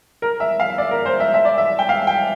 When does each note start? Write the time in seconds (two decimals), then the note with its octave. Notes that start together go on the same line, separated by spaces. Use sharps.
0.22 A#4
0.40 E5
0.60 F5
0.78 D5
0.91 A#4
1.06 C5
1.20 E5
1.34 E5
1.45 D5
1.58 E5
1.79 G5
1.89 F5
2.07 G5